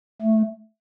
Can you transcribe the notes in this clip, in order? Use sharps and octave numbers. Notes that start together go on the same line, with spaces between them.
A3